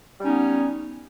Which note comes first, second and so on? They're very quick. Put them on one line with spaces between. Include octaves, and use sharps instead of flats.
G3 C#4 D#4 B3